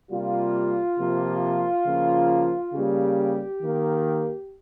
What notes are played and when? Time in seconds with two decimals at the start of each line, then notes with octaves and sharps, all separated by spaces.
0.11 C3 G3 A#3 F4
0.99 C3 F3 A#3
1.86 C#3 F3 A#3
2.74 C#3 G3 A#3 G4
3.61 D#3 A#3